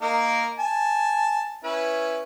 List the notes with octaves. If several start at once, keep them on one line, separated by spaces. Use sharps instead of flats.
A#3 D#4 A#4
G#5 A5
C#4 E4 B4